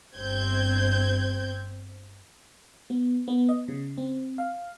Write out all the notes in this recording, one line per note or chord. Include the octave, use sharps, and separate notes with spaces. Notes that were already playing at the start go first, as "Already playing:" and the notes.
G1 C4 G6 G#6
B3
B3
D#5
C#3
C4
F5